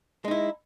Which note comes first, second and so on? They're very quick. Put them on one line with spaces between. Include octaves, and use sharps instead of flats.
G#3 D#4 E4